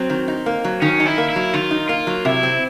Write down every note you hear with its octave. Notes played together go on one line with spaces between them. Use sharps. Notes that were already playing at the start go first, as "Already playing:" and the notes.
Already playing: F#3 C4
D#3
D#4
A#3
F#3
D#3 C#4
D#4
E4
A#3
E4
F#3
D#3 F4
D#4
A#3 F4
F#3
C3 E4
C4